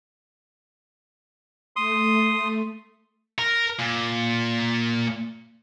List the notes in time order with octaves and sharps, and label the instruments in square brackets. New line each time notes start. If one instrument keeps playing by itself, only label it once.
[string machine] A3 [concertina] C6 D#6
[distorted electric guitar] A#4
A#2